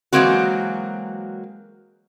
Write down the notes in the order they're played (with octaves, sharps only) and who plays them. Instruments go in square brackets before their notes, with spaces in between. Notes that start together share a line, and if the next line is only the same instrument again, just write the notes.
[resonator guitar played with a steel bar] E3 F#3 G#3 A#3 C4 F#4